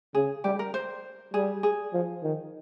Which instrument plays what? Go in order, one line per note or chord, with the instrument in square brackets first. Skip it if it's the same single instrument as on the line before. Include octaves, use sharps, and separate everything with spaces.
[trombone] C#3 [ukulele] G#4
[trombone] G3 [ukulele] G4
[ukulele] A#4
C5
[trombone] G3 [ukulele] G#4
[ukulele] G#4
[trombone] F3
D#3